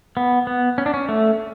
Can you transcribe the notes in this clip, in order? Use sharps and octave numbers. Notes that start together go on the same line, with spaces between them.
B3
B3
C#4
D4
C#4
A3